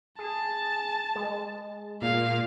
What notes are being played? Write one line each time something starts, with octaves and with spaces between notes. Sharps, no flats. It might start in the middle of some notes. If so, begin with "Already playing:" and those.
G#4 A5
G#3
A#2 F5